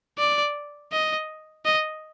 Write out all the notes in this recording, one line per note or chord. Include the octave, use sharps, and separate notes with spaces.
D5
D#5
D#5